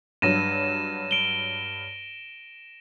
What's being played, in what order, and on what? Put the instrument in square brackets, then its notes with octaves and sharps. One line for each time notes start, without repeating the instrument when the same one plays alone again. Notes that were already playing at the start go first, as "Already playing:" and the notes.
[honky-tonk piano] G2 F#3 [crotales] A#6 E7 [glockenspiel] D#7
[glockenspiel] D7 G7